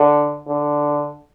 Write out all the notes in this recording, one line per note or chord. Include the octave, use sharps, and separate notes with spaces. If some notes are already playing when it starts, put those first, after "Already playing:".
Already playing: D3
D3